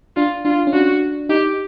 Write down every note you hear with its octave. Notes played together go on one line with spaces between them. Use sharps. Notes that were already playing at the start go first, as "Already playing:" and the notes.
D4 F4
D4 F4
C#4
D4 F#4
D#4 G4